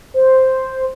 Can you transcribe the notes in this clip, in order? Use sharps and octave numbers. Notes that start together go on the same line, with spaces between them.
C5